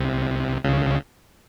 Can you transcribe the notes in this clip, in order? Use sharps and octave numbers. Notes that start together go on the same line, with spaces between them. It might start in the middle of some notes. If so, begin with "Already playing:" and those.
Already playing: C2 C3
C#2 C#3